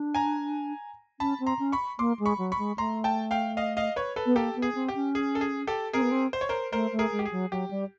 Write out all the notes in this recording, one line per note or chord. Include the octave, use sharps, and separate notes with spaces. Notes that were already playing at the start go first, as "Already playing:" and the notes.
Already playing: D4
G#5 A#5
C#4 A5 B5
C4
A#5 C6
C#4
B5 C#6
A#3 C6 D6
G#3
B5 C#6
F#3
B5 C#6
G#3
A3 A#5 C6
G5 A5
F5 G5
D#5 F5
D#5 F5
B4 C#5
A4 B4
B3
A#3 G4 A4
B3
G#4
C4
G4
C#4
G#4
A4
G#4
G4 A4
C4 G#4 A#4
B3
C4
C5
C#5
A#4 C5
A3 A#4 C5
A3
G#4 A#4
G#3
G4
G#4
F#3
F#3 G4
G3